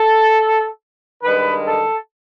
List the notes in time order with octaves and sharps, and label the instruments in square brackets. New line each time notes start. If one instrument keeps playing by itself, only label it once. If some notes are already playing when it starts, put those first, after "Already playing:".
Already playing: [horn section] A4
G2 D#3 G#3 B4
A4